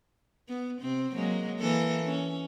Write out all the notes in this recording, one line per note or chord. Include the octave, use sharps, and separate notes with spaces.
B3
C3 C4
F#3 G#3 A#3
E3 A#3 A4
C#4